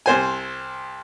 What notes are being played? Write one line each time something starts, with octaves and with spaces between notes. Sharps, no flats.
C2 C5 G#5